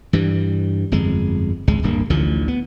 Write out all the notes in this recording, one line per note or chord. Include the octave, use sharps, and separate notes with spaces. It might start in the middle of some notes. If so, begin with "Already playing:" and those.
G2 E3 G3
G1 F2 G#3
G#1 C#2 G#3
D1 G2 A#3
A1 D2 D3 F3
B3